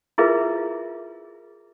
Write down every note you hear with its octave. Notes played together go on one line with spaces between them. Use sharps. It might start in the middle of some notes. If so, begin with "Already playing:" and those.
E4 F4 G#4 A#4 B4 E5